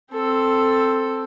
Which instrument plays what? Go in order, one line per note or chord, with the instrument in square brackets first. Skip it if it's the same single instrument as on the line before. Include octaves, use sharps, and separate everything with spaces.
[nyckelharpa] C4 A4